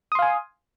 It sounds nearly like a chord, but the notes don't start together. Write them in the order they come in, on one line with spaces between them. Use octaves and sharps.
D#6 C6 F5 G#5